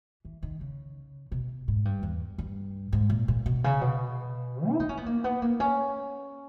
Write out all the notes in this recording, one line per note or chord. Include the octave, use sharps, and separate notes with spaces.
E3
D#3
C#3
B2
G#2
G2
E2
G2
G#2
A#2
A#2
B2
C#3
B2
E4
D#4
C#4
B3
A#3
B3
A#3
C#4